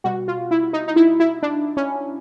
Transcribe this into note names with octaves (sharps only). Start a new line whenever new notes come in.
B2 G3 F#4
F4
E4
D#4
D#4
E4
E4
D4
C#4